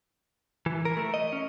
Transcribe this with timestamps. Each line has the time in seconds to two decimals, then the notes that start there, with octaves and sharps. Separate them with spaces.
0.66 E3
0.85 A#4
0.97 A3
1.14 D#5
1.32 C#4